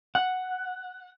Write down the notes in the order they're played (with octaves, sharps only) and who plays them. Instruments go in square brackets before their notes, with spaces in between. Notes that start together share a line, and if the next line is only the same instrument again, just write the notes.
[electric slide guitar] F#5